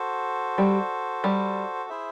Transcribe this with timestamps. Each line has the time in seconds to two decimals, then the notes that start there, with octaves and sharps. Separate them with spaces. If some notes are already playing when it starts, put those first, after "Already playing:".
Already playing: F#4 A4 C5
0.58 G3
1.24 G3
1.90 E4 G#4 C5 E5